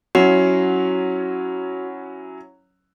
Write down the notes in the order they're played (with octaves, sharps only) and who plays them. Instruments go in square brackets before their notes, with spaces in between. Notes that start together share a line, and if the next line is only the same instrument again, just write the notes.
[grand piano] F#3 C#4 E4 [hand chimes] F#4